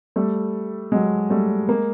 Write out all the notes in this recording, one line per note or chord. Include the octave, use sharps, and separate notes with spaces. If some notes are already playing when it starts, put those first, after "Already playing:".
G3 A3
F#3 G#3
G3 A3
G#3 A#3